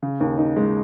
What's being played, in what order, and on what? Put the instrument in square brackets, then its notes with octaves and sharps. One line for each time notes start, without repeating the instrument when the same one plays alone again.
[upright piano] C#3
D#2
D#4
G#3